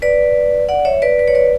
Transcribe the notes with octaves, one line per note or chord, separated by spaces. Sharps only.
B4 D5
D5 F#5
C#5 E5
B4 D5
B4
C#5
B4 D5